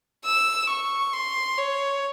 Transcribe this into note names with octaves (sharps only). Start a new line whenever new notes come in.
E6
C#6
C6
C#5